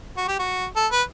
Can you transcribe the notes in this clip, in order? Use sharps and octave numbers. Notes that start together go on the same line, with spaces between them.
F#4
G4
F#4
A4
B4